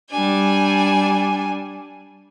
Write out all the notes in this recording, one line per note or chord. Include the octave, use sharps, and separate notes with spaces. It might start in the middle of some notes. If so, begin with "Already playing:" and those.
G3 D4 G#5